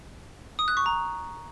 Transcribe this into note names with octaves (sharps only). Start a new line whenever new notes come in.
D#6
F#6
C#6
A#5